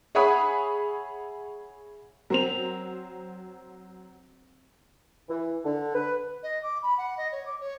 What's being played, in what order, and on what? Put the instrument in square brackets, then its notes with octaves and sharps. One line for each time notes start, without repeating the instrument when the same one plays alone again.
[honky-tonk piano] G#4 C#5 E5 F#5 B5 D#6
[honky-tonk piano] F#3 C5 F7 [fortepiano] C4 A#4
[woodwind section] E3
D3
B4
[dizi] D#5
D6
B5
F#5
D#5
C#5
D6
C#5